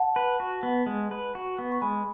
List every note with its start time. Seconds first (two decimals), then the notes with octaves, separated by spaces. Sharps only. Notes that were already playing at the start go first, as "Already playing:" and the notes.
Already playing: F#5 A5
0.16 B4
0.40 F#4
0.63 B3
0.86 G#3
1.11 B4
1.35 F#4
1.59 B3
1.72 C#6
1.81 G#3 G#5 B5